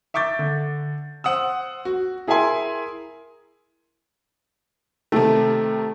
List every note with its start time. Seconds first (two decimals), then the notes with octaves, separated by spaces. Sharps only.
0.14 E5 C#6 D6 G6 A6
0.39 D3
1.24 C5 F#5 D#6 E6
1.85 F#4
2.27 E4 G#4 A#4 E5 G#5 C6
5.12 C3 D#3 A3